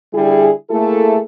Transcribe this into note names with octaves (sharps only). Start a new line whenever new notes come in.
D3 G3 E4 G#4
A3 A#3 E4 G#4 A4